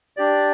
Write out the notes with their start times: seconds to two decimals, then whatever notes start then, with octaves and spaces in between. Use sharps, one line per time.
0.17 D4 G4 D5